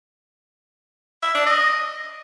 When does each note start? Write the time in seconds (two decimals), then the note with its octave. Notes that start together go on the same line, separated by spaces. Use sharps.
1.23 E5
1.34 D4
1.46 D#5